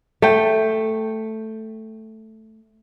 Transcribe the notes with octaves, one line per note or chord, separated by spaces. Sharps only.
A3 G5